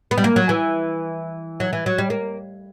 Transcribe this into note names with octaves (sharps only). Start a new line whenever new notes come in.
B3
G3
A#3
F#3
E3
F#3
E3
F#3
G3
A#3